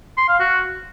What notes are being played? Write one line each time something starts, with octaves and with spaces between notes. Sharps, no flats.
C6
F5
F#4